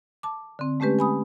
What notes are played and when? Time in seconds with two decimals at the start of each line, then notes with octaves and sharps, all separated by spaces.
0.23 A5 D6
0.59 D3 C4
0.80 G#3 A3 C#4 G4 B4
0.99 G#5 B5 D#6